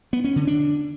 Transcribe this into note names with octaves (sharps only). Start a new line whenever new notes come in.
B3
C#4
D3
D4